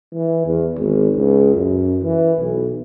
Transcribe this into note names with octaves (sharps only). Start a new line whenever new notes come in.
E3
E2
G#1
C#2
F#2
E3
B1